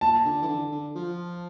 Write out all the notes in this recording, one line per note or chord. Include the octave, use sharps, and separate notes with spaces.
A#2 A5
D3
E3
D3
D3
F3